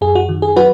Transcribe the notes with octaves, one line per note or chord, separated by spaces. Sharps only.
F#2 G#4
F#4
D#3
G#4
F#3 F#4 B4